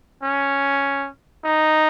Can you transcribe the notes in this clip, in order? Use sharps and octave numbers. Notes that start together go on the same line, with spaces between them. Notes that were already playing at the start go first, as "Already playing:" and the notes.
C#4
D#4